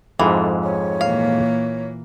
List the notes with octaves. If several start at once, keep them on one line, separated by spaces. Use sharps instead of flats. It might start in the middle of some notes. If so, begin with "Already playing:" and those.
F2 G#2 E3 A4
C#5
A#2 E3 A#3 F5